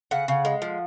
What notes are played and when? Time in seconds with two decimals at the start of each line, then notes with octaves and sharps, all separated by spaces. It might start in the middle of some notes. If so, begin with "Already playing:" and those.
0.11 C#3 F#5
0.28 C#3
0.45 G#3
0.62 F3